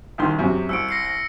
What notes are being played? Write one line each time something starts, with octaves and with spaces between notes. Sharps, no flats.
C2 D#3 C6
F#2 C3
C2 E6 C#7 D7
A#6 C7 C#7
A#6